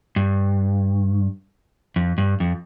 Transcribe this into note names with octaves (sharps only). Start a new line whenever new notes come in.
G2
F2
G2
F2